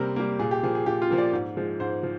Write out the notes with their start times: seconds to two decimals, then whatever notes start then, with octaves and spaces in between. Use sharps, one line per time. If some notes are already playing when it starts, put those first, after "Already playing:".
Already playing: C3 G3 A#3 A#4 C5
0.16 G3 A#3
0.39 A#2 G#4
0.51 G4
0.63 F3 A#3 G#4
0.75 G#4
0.86 A#2 G4
1.02 F4
1.10 F3 A#3
1.18 D5
1.33 G#2
1.57 F3 G#3
1.80 G#2 C5
2.03 F3